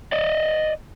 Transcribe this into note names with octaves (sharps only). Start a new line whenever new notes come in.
D5 D#5